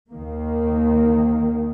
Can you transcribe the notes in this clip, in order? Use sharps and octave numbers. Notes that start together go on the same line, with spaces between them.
D#2 D#3 A#3